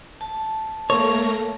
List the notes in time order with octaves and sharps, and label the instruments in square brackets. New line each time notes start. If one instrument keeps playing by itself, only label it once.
[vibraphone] A5
[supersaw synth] A3 A#3 A#5 [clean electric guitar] C#5